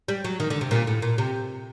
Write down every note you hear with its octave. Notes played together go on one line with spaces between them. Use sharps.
G3
F#3
D#3
D3
C3
A#2
A2
A#2
C3